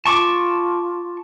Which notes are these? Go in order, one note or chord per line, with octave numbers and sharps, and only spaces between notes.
F4 A5 C#6 D6